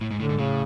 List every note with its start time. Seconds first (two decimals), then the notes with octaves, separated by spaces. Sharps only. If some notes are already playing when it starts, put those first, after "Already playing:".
0.01 A2
0.11 G#2
0.20 A2 D3
0.29 G#2
0.39 A2 C#3